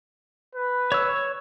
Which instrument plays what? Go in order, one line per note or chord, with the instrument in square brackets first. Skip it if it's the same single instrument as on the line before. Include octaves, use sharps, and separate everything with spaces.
[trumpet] B4
[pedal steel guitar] C#5 E6